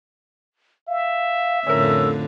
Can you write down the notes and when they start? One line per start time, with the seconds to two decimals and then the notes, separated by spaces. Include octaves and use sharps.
0.88 E5 F5
1.66 F2 A2 D3 C#4 A#4 E6